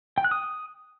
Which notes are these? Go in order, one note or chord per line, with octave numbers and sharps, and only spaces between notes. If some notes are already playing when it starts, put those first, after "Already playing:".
G5
F#6
D#6